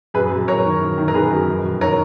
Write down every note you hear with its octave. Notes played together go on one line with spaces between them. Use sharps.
F#2 G#4 B4
F#2
F#2 A#4 C#5
D#3
F#2
D#3
A#4
D#3 G#4 B4
F#2
F1
F1
D#3 A#4 C#5